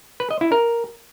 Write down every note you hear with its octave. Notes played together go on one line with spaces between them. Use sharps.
B4
D#5
E4
A#4